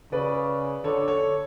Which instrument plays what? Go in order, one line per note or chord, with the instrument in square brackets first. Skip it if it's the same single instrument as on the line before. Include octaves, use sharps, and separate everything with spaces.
[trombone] C#3 [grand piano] B4 D5
[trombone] D3 [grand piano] A4 C#5
[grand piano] A4 C#5